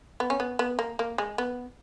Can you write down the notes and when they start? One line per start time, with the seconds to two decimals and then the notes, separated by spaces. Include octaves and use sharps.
0.20 B3
0.30 C#4
0.40 B3
0.59 B3
0.79 A#3
0.99 A#3
1.18 G#3
1.38 B3